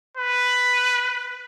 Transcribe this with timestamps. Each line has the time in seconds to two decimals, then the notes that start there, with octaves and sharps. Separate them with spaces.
0.17 B4